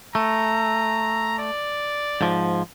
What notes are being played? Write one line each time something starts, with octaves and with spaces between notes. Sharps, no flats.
A3 A#5
D5
G#2 F3